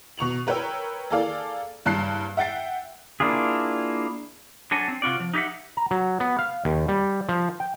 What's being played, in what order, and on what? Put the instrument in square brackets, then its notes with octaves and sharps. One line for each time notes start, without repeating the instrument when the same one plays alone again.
[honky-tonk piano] B2 C#6 F7 F#7
A#4 B4 C#5 G5 E6
A#3 G#4 A4 D5 F5
F#1 G2 A5 F#6 C7
E5 F#5 G5 A6 C7
[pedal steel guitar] A#3 D4 E4 F4 G#4
[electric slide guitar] F#3 D4 A4 G#5
C4
C3 F4 F#4 D5
F3
D#4 G4 G#4 E5 F#5
[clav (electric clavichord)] A#5
F#3
B3
F5
D#2
G3
F3
G5